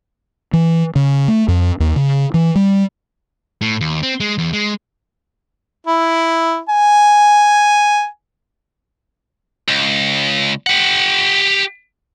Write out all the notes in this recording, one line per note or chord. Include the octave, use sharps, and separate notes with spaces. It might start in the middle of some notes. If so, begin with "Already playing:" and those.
E3
C#3
A3
F2
D#2
C#3
E3
G3
A2
D#2
C4
G#3
E2
G#3
E4
G#5
C#2
G4 F#5